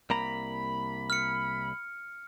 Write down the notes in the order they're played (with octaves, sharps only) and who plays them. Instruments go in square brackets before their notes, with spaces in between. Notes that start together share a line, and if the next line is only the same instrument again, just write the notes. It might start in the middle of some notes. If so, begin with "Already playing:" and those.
[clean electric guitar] C2 A#3 A#5 [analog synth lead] B5
[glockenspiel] F6 C#7